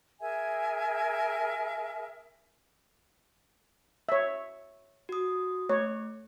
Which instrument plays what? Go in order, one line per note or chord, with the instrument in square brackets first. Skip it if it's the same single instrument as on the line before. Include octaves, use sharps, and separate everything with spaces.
[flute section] G#4 A#4 E5 G#5
[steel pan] C#5 E5
[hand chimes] F#4 D#6
[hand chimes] A3 [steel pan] C#5